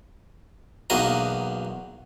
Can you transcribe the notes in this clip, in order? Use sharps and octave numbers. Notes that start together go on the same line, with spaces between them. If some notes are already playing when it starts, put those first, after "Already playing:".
B1 E2 F#3 A#3 D#5